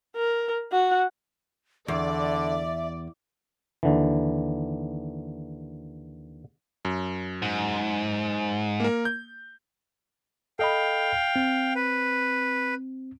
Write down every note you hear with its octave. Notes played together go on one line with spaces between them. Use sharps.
A#4
F#4 F#5
E2 D3 D5 E5
D#2 D3 E3
F#2
G#2
A#3 A#4
G6
A4 D#5 F5 G5 B5
C4
B4